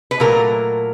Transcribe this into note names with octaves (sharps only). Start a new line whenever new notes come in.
B4
A#2 F#3 A3 A#4